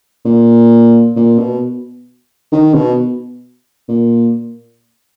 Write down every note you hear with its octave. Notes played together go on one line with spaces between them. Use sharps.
A#2
A#2
B2
D#3
B2
A#2